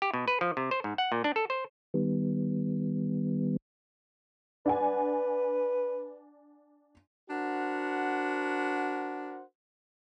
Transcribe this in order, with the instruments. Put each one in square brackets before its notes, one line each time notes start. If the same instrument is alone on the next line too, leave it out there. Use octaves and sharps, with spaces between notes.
[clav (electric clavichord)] G4
B2
B4
F3
C3
C5
G#2
F#5
A#2
D4
A4
C5
[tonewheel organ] D#3 G3 B3
[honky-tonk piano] D4 F#5 G#5 [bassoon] B4
[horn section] D4 F#4 A#4 C5 F#5